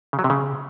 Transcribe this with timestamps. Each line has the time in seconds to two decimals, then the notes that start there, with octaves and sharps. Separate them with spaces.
0.13 C#3
0.19 F#3
0.24 C3
0.30 C#3